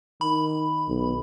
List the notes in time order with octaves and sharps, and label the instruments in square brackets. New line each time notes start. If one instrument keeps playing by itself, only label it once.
[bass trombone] D#3 [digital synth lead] B5
[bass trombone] B1